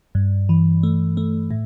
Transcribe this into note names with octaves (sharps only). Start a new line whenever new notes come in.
G2
E3
A3
A3
A2